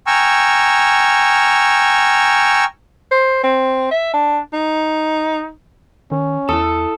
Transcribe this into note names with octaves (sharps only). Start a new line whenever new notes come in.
G5 G#5 A#5 C#6 E6 F6
C5
C4
E5
D4
D#4
D#3 C#4
E2 E4 A4 A5 D#6